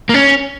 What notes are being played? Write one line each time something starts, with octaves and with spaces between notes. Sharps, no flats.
A#3
C#4